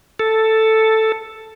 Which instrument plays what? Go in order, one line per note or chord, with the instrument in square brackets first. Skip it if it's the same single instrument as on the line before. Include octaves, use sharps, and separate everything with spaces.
[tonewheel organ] A4